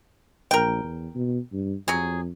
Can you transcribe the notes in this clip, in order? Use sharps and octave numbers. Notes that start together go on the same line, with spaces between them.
A#1 A#4 G5
E2
B2
G2
F2 F#3 G#4